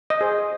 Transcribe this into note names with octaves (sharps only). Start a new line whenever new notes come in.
D#5
G#4 C5